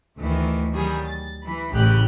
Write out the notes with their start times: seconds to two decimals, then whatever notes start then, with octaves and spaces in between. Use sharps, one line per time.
0.19 D2 D#3 E3 A3
0.72 D#3 F#3 G3 G#4
1.07 A6
1.44 E3 B5
1.74 A1 C#3 E4 G4 G5 F#6